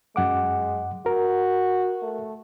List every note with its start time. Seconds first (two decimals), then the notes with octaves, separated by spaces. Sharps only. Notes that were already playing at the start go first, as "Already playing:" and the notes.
0.16 F#2 G#3 F#5 D6
1.06 F#4 A#4
2.02 A3